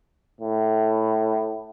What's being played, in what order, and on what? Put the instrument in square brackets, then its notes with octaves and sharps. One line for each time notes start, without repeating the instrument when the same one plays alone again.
[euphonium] A2